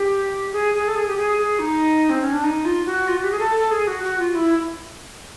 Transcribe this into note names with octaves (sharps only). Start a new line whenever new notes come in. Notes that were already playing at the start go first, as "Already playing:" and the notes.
Already playing: G4
G#4
G#4
A4
G#4
G4
G#4
G#4
D#4
C4
C#4
D4
D#4
F4
F#4
F4
F#4
G4
G#4
A4
A4
G#4
F#4
F#4
F4
E4